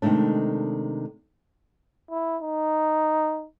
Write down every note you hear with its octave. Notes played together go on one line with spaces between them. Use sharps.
C3 D#3 G#3 A3 D4
E4
D#4